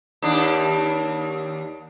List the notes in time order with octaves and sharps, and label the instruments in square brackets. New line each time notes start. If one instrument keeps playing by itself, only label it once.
[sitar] D#2 D4